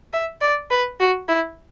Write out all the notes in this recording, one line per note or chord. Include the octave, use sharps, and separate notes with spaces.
E5
D5
B4
F#4
E4